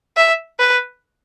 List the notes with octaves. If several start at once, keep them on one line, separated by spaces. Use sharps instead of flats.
E5
B4